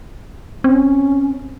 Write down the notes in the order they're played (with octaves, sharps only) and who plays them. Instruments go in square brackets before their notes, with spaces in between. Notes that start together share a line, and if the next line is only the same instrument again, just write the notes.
[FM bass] C4 [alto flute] C#4